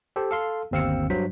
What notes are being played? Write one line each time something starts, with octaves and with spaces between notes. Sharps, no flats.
G4 A4 C5
A4 F5 C6
G1 D#2 C4 F5 E6 C#7
G2 F#3 C5 B6